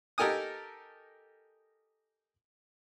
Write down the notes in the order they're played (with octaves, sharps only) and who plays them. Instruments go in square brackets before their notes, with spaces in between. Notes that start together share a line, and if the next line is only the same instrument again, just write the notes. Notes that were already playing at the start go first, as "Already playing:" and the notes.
[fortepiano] D#4 G4 A4 A#4 G#5 D#6